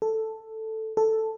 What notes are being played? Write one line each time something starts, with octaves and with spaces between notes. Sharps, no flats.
A4
A4